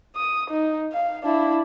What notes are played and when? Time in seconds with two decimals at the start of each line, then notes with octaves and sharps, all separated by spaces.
0.16 D#6
0.50 D#4
0.92 F5
1.23 D4 E4